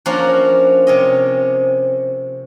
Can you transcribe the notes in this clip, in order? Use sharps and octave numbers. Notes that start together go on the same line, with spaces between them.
F3 A#3 C#4 D4 F#4 A#4
C3 C#4 D#5